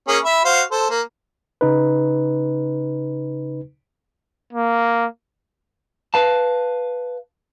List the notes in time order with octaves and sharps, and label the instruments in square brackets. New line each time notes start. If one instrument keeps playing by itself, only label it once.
[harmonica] A#3 C#4 G#4
E5 B5
F#4 C5 F5
A4 C5
A#3
[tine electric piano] C#3 D#4 B4
[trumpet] A#3
[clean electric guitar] B4 F5 A5